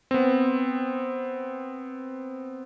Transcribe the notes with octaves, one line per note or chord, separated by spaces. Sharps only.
B3 C4